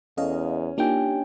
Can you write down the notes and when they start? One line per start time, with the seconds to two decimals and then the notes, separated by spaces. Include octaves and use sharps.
0.17 E2 C#4 A4 D#5 F5
0.78 A#3 D4 D#4 F4 G4 G5 G#5